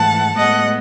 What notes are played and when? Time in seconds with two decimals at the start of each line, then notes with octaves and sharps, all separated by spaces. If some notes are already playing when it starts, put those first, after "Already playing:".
Already playing: G#2 E3 A3 F#5 A5
0.36 A2 G#3 B3 D#5 F#5